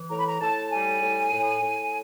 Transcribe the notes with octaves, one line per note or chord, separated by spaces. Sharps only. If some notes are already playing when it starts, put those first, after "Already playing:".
Already playing: E3
A2 A#5
B5
A#5
A2 A5
G3 G#5
A2
A2
A2